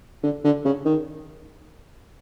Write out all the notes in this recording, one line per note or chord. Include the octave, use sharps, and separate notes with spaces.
D3
D3
C#3
D#3